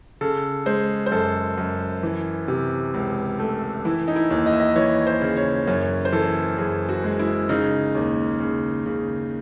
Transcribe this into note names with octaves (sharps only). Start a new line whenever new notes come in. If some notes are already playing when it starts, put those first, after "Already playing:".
C#3 A4
G#3 C5
C5
F#2 A4
F#2
E3
C3
C#2
A3
E3 E4
D#4
E4
D#2
D#5
E5
D#5
E3 C#5
C5
C#3
C#5
F#2 C#5
C5
E3 A4
F#2 G#4
F#4
G#3
E4
C#3 D#4
D#2
C#3
C#3